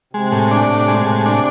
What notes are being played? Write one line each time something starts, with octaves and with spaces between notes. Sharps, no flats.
C3 G#3
A2
D4
A2
G#3
A2
D4